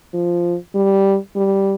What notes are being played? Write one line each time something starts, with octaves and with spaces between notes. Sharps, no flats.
F3
G3
G3